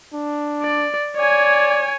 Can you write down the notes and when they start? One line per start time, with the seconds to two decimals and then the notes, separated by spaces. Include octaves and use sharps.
0.13 D4
0.62 D5
1.17 C#5 D5 G#5